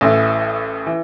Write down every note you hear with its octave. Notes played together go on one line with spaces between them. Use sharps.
A1 A2 E3
E3